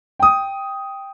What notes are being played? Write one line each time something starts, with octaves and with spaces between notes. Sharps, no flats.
G5 D#6